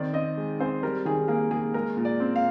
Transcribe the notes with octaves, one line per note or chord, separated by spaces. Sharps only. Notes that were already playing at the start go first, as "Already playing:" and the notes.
Already playing: D#3 C4 D5
C4 D#5
G#3
C4 C5
G3 A#4
D#3 G#4
A#3 G#4
A#3 G#4
G#3 A#4
A#2
D5
C4
F5